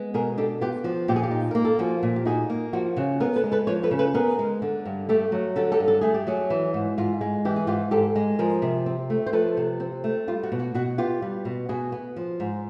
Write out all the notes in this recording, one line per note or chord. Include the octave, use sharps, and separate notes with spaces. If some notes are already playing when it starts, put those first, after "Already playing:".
Already playing: G#3 B3
B2 G#4 A#4
D4 G4 A4
B3 F4 G4
F3 F#4
A#2 G4
G#4
F4 G4
D#4
A#3 A#4
A4
F3 F#4 G#4
A#2
G4
D#4 F#4 G#4
A#3
F3 F#4
C#3 F#4
B3 G#4 A#4
A4 B4
G#3
A4 B4
F3 B4 C#5
A4 B4
C#3
A4 B4
B3 G#4 A#4
G#3
D3
G2
A3 G4 A4
F#3
D3 G4 A4
G4 A4
G2
A4
A3 G#4
G4
F#3 F#4 G#4
E3
G#2
G#2 F4
G#3
E3 G4
G#4
G#2 F4 G4
G#2 G4 A4
G#3
F3 G#4 A#4
C3
C4
A3
C5
F3 A4 B4
C3
C4
A3
G3 F4
F#4
B2
F#4
B2 F#4
B3 F4 G4
G3
B2
B2 F#4 G#4
B3
F3
G#2